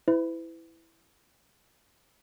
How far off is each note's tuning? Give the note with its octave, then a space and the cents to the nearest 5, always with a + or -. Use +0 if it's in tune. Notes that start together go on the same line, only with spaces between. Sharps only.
E4 +0 B4 +40